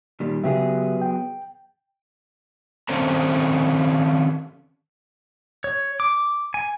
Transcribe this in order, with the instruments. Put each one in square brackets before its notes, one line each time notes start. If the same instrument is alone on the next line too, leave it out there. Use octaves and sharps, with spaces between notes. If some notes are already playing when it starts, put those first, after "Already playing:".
[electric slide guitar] A#2 D#3 G3
[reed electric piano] C#3 G4 E5 [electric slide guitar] F#3 B3 G#4
[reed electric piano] G5
[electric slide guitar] D#3 C4 C#4 A4 C5 A#5
[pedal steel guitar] C#5
D6
G#5